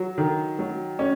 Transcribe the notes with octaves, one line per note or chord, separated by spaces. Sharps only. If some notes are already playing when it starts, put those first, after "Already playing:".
Already playing: F#3
D#3
F#3
C#4